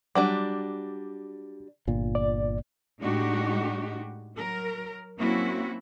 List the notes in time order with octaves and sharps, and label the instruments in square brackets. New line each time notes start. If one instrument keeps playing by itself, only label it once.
[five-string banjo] F#3 G3 D4 [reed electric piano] D6
[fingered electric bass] G1 A#2
[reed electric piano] D5
[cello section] A2 G#3 D4 D#4 F#4 G4
F#3 A#4
F#3 A#3 C4 C#4 E4 F#4